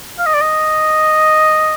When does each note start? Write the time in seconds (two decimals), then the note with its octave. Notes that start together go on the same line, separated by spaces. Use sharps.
0.19 F5
0.26 D#5
0.34 D5
0.41 D#5